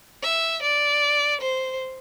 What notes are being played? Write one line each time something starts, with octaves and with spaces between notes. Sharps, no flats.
E5
D5
C5